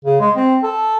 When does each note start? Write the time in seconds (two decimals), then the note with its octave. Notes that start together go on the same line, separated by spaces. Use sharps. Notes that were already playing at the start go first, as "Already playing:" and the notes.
0.05 C#3
0.20 G#3
0.36 C4
0.63 A4